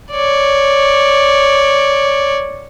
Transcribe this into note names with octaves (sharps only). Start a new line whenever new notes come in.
C#5 D5